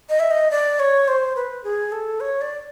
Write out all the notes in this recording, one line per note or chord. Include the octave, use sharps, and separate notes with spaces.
D#5
E5
D#5
D5
C#5
C5
B4
G#4
A4
C#5
D5